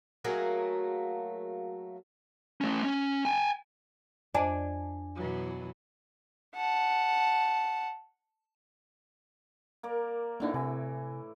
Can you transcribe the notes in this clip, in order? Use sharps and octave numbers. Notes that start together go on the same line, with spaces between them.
F#3 A3 A#3 G#4
A3 C#4
C#4
G5 G#5
F2 D4 C5 D#5 G#5
B2 E3 F#3
F#5 A5
A#3 A#4 D5
A2 D3 E3 A#3 D4 D#4
C3 E3 G#5